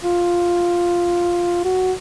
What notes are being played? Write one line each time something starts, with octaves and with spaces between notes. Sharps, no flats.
F4
F#4